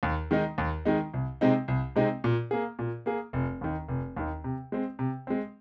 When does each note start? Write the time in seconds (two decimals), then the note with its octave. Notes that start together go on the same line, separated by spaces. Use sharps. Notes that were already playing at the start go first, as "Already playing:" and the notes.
0.03 D#2
0.31 D#3 G#3 D#4
0.58 D#2
0.85 D#3 G#3 D#4
1.13 C2
1.41 C3 G#3 C4 D#4
1.68 C2
1.96 C3 G#3 C4 D#4
2.24 A#2
2.51 A#3 G#4
2.79 A#2
3.06 A#3 G#4
3.33 F1
3.61 D#2 D#3
3.88 F1
4.16 D#2 D#3
4.44 C3
4.72 G#3 C4
4.99 C3
5.27 G#3 C4